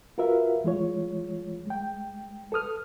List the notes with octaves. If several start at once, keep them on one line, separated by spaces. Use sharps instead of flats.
F4 F#4 A#4 B4 E5 F5
E3 G#3 F4 C#5
G#3 G5
A4 B4 D#6 F6